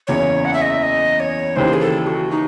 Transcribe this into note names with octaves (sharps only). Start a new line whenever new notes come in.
F#1 E2 C#3 C#5
F#5
E5
D#5
E5
D#5
C#5
D#2 C#3 E3 C5
G#4
A4
F#4
D#4